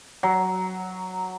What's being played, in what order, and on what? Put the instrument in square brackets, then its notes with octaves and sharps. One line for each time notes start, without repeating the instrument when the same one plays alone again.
[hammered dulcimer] F#3